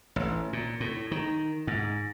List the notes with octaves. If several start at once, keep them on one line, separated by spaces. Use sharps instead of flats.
A1
A#2
A2
D#3
G#2